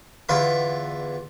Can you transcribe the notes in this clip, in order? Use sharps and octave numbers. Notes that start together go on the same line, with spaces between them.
E2 D3 F4 B4 B5 D#6